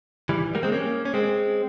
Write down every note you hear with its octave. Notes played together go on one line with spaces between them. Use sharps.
E3 G3
G3 A#3
G#3 C4
A#3 C#4
C#4
G#3 C4